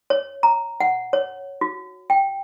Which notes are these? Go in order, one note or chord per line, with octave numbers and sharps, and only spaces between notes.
C#5
A#5
F#5
C#5
F#4
G5